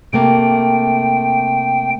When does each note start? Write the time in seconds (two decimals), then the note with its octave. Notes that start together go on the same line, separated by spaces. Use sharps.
0.13 C3 A3 A#3 G5